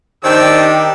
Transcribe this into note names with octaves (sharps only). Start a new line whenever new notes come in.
D#3 D4 G4 C5 G5 E6